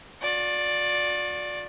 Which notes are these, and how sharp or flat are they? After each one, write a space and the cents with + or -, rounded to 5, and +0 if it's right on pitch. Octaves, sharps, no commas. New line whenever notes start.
F#4 -45 D5 +0